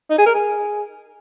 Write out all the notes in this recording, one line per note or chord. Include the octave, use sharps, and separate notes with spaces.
D#4
G#4
A#4
G#4